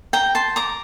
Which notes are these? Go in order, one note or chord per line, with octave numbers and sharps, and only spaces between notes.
G5 A#5
A5 C6
A#5 D6